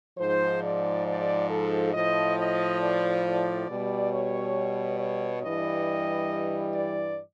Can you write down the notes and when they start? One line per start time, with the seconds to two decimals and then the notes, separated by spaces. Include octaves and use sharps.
0.18 G#2 F3 C5
0.63 D5
1.06 D5
1.49 A4
1.93 A2 F3 D#5
2.37 D#5
2.80 D5
3.24 D5
3.68 B2 G3
4.12 C#5
4.99 C#5
5.43 G2 E3 G3 D#5
6.74 D5